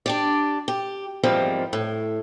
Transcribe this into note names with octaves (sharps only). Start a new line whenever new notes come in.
D4 G4 D5
G4
E2 G#2 F3 G3 A#3 C4
A2